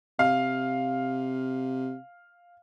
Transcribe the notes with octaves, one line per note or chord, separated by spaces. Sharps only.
C3 F5